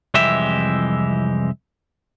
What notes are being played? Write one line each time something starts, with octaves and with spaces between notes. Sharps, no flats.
C2 F2 E3 G#3 G4 E5